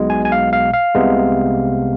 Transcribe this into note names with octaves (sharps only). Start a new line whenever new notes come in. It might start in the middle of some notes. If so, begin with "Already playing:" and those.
Already playing: B1 B2 G#3
G#5
G#5
F5
F5
F5
C2 C3 G#3 B3